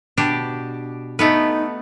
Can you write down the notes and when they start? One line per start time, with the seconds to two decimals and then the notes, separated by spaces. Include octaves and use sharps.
0.17 B2 D4 G4
1.19 A3 B3 D#4 B4